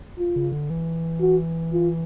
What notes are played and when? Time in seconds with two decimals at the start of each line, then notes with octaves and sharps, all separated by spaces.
0.18 F4
0.36 C#3
0.52 D3
0.70 E3
1.21 F#4
1.73 F4